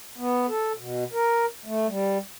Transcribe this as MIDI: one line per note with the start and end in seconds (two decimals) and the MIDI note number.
0.18 0.46 59
0.49 0.72 69
0.78 1.04 47
1.13 1.46 70
1.66 1.87 57
1.87 2.18 55